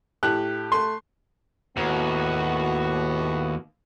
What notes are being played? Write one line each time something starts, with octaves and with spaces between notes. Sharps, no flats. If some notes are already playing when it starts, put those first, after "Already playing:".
A2 G4 F#6
A3 C6
D#2 A2 B3 F#4